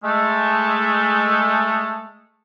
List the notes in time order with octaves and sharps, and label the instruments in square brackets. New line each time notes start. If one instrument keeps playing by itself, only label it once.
[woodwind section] G#3 A3